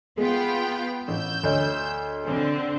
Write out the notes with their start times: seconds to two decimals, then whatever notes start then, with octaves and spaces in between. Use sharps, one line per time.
0.18 G#3 B3 F4 G5
1.08 A1 E6 G6
1.43 D2 C#5 D#5
2.26 D3 C4